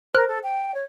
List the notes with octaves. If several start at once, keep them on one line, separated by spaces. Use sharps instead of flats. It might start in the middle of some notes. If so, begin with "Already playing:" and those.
A#4 C5 F6 F#6
A4
G5
C#5